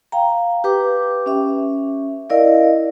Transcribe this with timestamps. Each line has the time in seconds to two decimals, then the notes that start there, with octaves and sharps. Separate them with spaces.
0.12 F5 G5 A#5
0.64 G4 B4 G5 D6
1.26 C#4 E5
2.30 E4 A#4 D5 D#5 F5